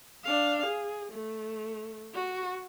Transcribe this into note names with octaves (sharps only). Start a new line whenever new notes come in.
D4 F5
G#4
A3
F#4